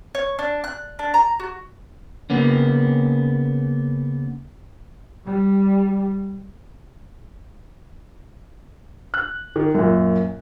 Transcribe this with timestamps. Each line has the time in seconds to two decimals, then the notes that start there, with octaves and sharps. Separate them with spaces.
0.15 C#5
0.39 D4
0.64 F#6
0.99 D4
1.14 A#5
1.40 F#4
2.30 C#3 A#3 B3 C#4
5.25 G3
9.14 F#6
9.56 D#3
9.75 F#2 A#2